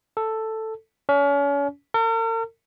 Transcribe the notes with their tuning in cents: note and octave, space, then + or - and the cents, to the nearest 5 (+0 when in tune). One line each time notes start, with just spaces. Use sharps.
A4 +5
C#4 +35
A#4 -45